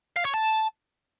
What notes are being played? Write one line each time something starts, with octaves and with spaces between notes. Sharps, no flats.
F5
C#5
A5